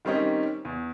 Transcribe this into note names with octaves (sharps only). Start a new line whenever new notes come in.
D#3 G3 C4 C#4 D#4
E2